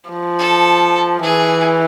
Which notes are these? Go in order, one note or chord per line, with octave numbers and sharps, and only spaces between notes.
F3
A4
E3 G#4